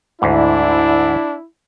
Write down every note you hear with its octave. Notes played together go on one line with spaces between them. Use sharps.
D2 G#2 D4 E4